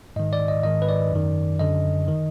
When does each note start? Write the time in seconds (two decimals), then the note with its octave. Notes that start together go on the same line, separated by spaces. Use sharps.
0.16 G#2 D#3 D#5
0.33 D5
0.48 D#5
0.63 G#2 D#3 D#5
0.82 B4
0.89 D5
1.12 F#2 D#3
1.59 F#2 D3 D#5
2.08 D#3